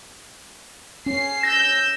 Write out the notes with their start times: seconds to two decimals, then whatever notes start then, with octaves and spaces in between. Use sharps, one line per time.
1.06 C#4 C7
1.43 E6 G6 A#6